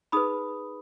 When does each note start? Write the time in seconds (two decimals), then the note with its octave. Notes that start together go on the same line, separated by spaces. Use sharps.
0.12 D#4 G#4 B4 B5 D#6